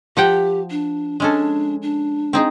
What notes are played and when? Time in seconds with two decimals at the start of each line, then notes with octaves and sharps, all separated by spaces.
0.17 F3 G4 F#5 G5
0.71 D4
1.20 G#3 C#4 D4 A4
1.83 D4
2.33 C4 D#4 G#4